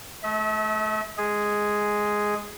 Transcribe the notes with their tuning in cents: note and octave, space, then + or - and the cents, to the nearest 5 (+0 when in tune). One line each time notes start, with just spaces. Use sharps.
A3 -25 E5 -45
G#3 +0 G#4 +0